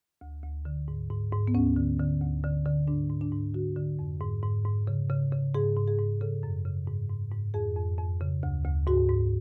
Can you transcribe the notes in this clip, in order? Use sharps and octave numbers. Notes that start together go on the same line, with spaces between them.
D2
D2
D3
G#2
G#2
G#2
B3
D2 C#4
D3
D3
D2
D3
D3
G#2 D4
G#2
D4
G#2
D3 F#4
D3
F2
G#2
G#2
G#2
C#3
C#3
C#3
G#2 G#4
G#2
G#4
G#2
C#3 A4
F#2
C#3
G#2
G#2
G#2
F2 G#4
F2
F2
C#3
D2
D2
G#2 F#4
G#2